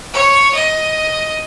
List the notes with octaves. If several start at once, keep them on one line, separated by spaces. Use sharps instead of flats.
C#5
D#5